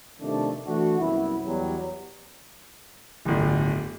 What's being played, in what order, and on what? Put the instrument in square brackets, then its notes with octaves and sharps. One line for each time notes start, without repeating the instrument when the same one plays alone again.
[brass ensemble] C3 D#3 F3 G3 A3 D4
E3 A3 D4 F#4
C2 F#2 B3 E4
E2 F#3 G3
[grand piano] D1 G1